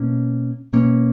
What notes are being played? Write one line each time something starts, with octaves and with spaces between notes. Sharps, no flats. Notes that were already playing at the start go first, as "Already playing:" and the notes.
Already playing: B2 A#3 C#4
B2 A#3 C#4